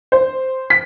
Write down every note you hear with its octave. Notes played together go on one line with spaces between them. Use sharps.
C5
B6